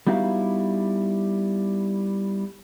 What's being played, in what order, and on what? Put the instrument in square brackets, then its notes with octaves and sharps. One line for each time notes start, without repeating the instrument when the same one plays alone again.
[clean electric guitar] G3 B3 D#4 E4 F#4 F5